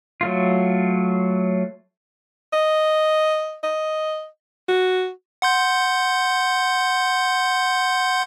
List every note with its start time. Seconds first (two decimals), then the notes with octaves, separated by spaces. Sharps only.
0.21 F#3 A3 F4
2.53 D#5
3.64 D#5
4.69 F#4
5.42 F#5 C6 G6